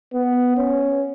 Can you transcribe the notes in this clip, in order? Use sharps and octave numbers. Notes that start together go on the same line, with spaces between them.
B3
C#4